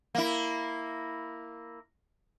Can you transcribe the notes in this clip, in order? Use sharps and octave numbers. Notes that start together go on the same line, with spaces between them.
A#3 E4